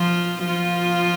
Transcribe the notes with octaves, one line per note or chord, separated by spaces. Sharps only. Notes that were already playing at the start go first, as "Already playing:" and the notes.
Already playing: F3 F4
F3 F4